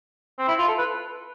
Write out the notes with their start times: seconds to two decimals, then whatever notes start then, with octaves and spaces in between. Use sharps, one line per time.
0.39 C4
0.48 E4
0.59 F4
0.68 A4
0.78 B4